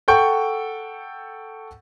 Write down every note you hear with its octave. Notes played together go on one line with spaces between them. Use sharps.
A4 F#5 G5 C#6 G6